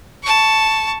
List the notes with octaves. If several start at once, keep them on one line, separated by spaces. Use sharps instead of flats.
A5 C#6